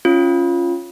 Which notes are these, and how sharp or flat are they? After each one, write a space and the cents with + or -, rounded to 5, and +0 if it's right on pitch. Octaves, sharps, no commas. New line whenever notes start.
C#4 +0 F4 -10